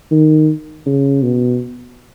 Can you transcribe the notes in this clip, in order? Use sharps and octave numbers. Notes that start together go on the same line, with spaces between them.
D#3
C#3
B2